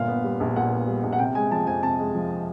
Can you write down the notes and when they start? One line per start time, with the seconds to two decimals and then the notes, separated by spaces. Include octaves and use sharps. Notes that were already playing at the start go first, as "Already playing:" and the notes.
Already playing: G1 A#2 F5
0.08 B3
0.24 G3
0.40 A#1
0.56 A#2 F#5
0.71 B3
0.87 G3
1.03 A#1
1.12 F#5
1.19 C3 G5
1.35 G#3 G#5
1.51 F3 A5
1.67 F2 G#5
1.83 C3 A5
1.99 G#3
2.15 F3